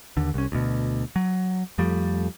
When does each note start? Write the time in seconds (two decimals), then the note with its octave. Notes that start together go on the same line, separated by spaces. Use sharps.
0.17 D#2 D3
0.34 C2 C#4
0.52 D2 B2
1.16 F#3
1.78 F2 F3 G3 A3